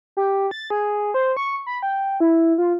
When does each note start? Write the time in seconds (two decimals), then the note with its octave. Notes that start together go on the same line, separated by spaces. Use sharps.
0.17 G4
0.51 A6
0.70 G#4
1.14 C5
1.37 C#6
1.67 B5
1.83 G5
2.20 E4
2.58 F4